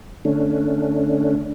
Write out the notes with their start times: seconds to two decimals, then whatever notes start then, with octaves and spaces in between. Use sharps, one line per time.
0.25 D3 A3 C#4 D4